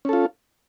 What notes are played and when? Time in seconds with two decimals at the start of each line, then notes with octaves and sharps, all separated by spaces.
0.05 C#4
0.09 A4
0.13 F4